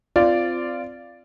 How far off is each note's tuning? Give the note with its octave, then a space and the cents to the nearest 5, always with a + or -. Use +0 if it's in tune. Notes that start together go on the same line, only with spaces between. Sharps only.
C4 -15 F4 -10 D5 +0